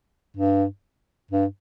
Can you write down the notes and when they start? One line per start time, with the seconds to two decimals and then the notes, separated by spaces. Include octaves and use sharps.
0.37 G2
1.31 G2